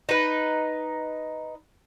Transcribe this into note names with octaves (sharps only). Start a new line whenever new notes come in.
D#4 B4